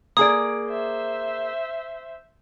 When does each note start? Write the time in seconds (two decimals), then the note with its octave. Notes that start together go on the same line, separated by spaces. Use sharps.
0.17 A#3 G#4 D5 D#6
0.68 C5 E5